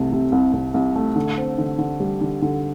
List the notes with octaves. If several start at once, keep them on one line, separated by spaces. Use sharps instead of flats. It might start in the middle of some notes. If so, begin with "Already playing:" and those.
Already playing: C2 C3 A3
C3
C2
C2
C2
A3
D3
C4
D3
D3
G3
D3
D3